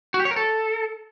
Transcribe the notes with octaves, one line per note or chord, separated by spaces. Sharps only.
F#4
G4
C#5
A#4
A4